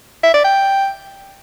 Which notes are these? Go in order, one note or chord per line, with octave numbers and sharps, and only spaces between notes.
E5
D5
G5